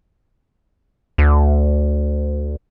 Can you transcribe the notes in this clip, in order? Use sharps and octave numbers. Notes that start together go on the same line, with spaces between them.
D2